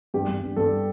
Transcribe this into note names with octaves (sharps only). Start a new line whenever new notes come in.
G2 G4
G2
G2
G2 A4